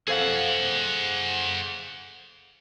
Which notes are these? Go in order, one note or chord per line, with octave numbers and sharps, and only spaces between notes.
G#4 A4 C5 F5 F#5